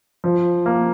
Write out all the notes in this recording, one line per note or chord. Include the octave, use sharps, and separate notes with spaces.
F3
A#3